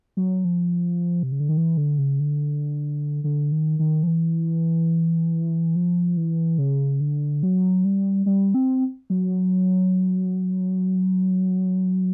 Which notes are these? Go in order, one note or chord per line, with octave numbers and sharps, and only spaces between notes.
F#3
F3
C3
C#3
D3
D#3
E3
D3
C#3
D3
D3
D#3
D#3
F3
E3
F3
E3
C#3
D3
F#3
G3
G3
C4
F#3